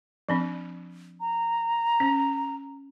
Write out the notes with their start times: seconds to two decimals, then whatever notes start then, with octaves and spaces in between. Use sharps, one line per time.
0.29 F3 C4 D4
1.20 A#5
2.00 C#4